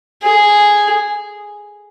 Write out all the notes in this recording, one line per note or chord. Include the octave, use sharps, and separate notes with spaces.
G#4